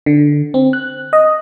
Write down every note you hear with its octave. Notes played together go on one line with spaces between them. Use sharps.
D3
C4
F#6
D#5